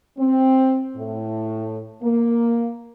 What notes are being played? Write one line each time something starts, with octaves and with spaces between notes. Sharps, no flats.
C4
A2
A#3